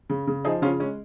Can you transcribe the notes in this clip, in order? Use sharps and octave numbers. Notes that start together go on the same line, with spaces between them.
C#3
C#3
F3 D#4 G#4
C#3 C#4 F4
G#3 C#4